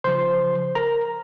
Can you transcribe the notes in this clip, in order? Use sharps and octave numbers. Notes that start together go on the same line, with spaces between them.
C#3 F3 C5 C6
A#4 A#5